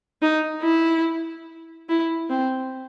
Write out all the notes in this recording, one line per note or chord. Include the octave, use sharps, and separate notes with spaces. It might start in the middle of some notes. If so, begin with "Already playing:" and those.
D#4
E4
E4
C4